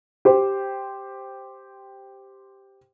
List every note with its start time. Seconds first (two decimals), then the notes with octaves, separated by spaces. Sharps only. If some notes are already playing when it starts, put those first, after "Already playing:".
0.25 G4 C5